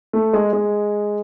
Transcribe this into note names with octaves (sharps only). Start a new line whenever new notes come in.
A3
G#3
G#3